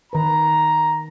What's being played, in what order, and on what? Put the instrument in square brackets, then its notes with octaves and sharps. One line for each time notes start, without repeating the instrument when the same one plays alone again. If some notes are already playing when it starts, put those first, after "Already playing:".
[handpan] D#3 B4 [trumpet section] A#5